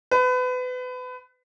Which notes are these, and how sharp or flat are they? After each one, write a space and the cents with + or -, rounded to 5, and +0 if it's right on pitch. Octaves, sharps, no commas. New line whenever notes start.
B4 +30